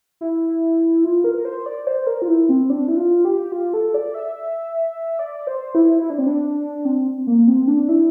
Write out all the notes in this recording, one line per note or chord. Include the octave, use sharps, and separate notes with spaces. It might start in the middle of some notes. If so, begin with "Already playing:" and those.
E4
F4
A#4
A#4
C5
D5
C5
A#4
F4
E4
C4
D4
E4
F4
G4
F4
A4
D5
E5
D5
C5
E4
E4
D4
C4
D4
C4
A#3
C4
D4
E4